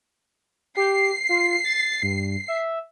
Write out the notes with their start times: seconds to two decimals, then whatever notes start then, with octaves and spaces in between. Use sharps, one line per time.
0.76 G4 C7
1.29 F4
1.64 A6
2.03 G2
2.48 E5